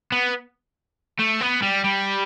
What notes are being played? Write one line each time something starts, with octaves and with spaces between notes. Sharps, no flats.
B3
A3
B3
G3
G3